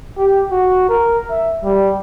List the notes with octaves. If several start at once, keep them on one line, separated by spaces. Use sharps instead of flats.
G4
F#4
A#4
E5
G3